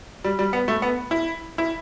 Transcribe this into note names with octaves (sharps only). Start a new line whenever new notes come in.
G3
G3
B3
A3
B3
E4
E4